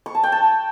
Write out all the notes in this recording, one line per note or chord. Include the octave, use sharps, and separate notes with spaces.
C#6
A5
G5
A5